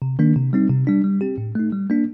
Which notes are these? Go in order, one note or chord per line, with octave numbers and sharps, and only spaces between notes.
C3
D#3 A#3 D4
C3
G3 C4 D#4
C3
G3 D4
G3
C4 G4
A2
A3 D#4
G3
A#3 D4